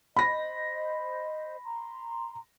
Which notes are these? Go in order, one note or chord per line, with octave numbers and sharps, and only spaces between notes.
C5 D#5 B5 A#6
A#5 C6